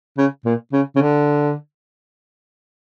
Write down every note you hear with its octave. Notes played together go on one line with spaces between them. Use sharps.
C#3
A#2
C#3
C#3
D3